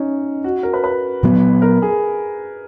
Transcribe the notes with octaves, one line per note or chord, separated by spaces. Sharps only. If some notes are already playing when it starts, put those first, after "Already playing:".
Already playing: C#4 D#4
F#4
A#4
B4
B4
A#2 F#3 B3
A#4
G#4